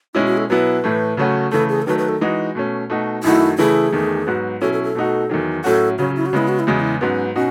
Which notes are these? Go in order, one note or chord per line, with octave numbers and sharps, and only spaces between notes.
B2 G#3 C#4 D#4 E4
F#4
A4
B2 F#3 B3 E4 B4
A2 E3 A3
C#3 F#3 A3 C#4 F#4
C#3 E3 A3 A4
G#4
A4
D#3 F#3 A3 B4
B4
A4
E3 G#3 D#4 F#4
B2 A3 C#4
B2 A3 D#4 F#4
F#2 D#3 A3 D#4 E4 F#4
C#3 E3 A3 E4 G#4
E2 D#3 A3
G#2 F#3 B3 F#4
B2 F#3 C#4 E4 A4
A4
A4
B2 A3 D#4 F#4
E2 D#3 F#3
A2 F#3 C#4 F#4 A4
C#3 F#3 C#4 F#4
E4
F#4
C#3 G#3 B3 E4
F#4
E4
E2 C#3 G#3 F#4
E4
G#2 F#3 B3 C#4
B2 C#4 D#4 F#4